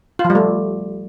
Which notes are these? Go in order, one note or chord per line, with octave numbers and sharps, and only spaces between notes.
F4
F3
G3
A3